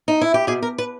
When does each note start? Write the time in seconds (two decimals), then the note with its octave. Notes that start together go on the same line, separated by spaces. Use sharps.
0.08 D#4
0.21 E4
0.34 G4
0.47 B2 G#4
0.62 A#4
0.78 B4